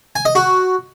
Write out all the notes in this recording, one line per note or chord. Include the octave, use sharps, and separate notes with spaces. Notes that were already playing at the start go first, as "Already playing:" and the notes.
G#5
D#5
F#4